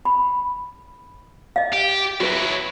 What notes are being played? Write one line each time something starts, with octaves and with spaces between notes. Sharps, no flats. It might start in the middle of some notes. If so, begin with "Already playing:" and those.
B5
D#5 F5
G4
F#3 E4 F#4 B4